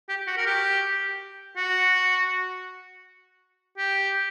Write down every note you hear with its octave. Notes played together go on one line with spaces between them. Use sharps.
G4
F#4
A#4
G4
F#4
G4